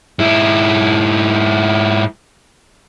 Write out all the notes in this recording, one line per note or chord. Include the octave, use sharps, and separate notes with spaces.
G#2 E4